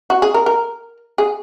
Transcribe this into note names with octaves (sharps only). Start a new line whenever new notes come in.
F#4
G#4
A#4
A#4
G#4